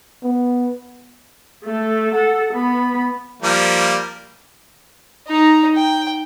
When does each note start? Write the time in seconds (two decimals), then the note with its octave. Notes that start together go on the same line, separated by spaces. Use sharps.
0.23 B3
1.64 A3 A4
2.14 A4 F#5
2.53 B3 B5
3.43 F3 G3 A#3
5.27 D#4 A#5
5.75 G5